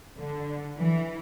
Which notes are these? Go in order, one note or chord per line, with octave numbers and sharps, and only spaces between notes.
D3
E3